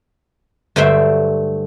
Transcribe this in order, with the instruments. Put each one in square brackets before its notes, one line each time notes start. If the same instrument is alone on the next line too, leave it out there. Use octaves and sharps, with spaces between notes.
[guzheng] G2 D3 F#3 A3 C5 E5